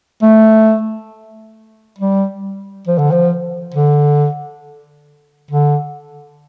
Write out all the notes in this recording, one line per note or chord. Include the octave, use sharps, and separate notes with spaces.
A3
G3
F3
D3
F3
D3
D3